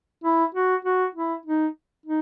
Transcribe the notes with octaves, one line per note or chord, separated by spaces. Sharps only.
E4
F#4
F#4
E4
D#4
D#4